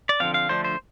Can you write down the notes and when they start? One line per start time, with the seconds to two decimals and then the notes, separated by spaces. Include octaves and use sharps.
0.09 D5
0.20 D3 F3 C4 F5
0.34 F5
0.49 D3 F3 A3 D4 C5
0.65 C5